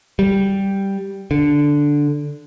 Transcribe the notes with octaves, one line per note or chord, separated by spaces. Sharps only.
G3
D3